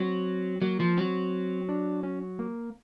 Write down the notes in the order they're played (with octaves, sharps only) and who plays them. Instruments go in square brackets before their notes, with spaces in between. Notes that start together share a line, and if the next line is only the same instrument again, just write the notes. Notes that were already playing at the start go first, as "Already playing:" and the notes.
Already playing: [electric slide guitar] F#3 [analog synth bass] C4
[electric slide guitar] F#3 [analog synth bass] A#3
[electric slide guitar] F3
[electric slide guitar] F#3 [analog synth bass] C4
[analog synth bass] D4
C#4
A#3